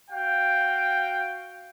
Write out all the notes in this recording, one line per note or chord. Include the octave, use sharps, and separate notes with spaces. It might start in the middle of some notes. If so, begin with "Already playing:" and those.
F#4 F5 G5